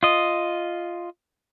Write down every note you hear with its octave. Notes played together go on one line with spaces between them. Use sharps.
F4 D#5